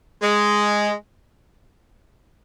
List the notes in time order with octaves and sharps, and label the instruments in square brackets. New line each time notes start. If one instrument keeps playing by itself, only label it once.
[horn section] G#3